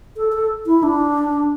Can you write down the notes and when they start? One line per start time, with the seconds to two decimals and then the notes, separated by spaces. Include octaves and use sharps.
0.17 A4
0.33 A4
0.67 E4
0.83 D4